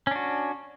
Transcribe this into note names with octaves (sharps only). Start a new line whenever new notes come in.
C#4 D4 F#4